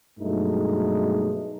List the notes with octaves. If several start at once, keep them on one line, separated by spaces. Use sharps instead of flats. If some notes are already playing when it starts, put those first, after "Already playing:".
G2 B2 F#3 G#3 A3 D#4